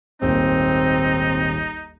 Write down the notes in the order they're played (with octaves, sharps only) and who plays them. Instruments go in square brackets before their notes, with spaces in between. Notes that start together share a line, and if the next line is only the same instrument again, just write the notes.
[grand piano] D#1 G#1 A#3 [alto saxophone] C4 [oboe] D#4